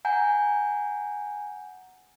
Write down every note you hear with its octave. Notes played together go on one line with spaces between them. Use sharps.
F#5 G#5 A#5 G6